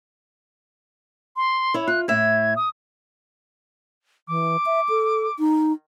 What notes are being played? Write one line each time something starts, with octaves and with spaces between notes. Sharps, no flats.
C6
E4 C#5
F4 F#6
A2 E5 G#6
D#6
E3 D6
E5
A4
D#4